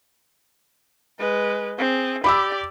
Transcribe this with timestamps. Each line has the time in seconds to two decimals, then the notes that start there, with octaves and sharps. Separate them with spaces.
1.19 G#3 B4
1.78 C4 G#4
2.24 G4 D5 B5 D6 E6